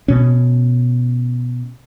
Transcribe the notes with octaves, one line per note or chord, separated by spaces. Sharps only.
B2 C#4